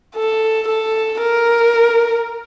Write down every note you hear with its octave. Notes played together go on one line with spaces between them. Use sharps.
A4
A4
A#4